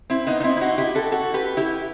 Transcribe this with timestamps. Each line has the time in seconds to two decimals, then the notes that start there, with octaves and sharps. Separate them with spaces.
0.10 C4 E4
0.27 B3 D#4
0.40 D#4
0.44 C4 E4
0.57 E4
0.61 D#4 F#4
0.78 E4 G4
0.95 F#4 A4
1.12 F#4 A4
1.34 G4 B4
1.57 E4 G4